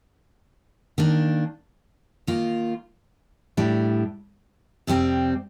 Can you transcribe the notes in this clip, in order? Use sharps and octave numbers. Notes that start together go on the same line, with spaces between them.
D#3 A#3 D4
D#3 A#3 F4
A2 G3 D4
F2 C3 G3 C4